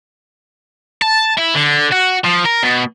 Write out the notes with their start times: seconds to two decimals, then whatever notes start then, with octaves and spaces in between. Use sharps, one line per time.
1.02 A5
1.37 E4
1.54 D3
1.91 F#4
2.24 F3
2.45 A#4
2.63 B2